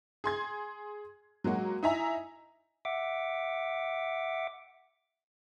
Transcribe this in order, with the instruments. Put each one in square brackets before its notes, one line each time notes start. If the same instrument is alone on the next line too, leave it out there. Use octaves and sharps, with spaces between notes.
[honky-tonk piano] G#4 C6 G#6
F#3 G#3 A#3 F#4
D#4 E4 E5 G#5 A#5
[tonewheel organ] E5 F#5 D6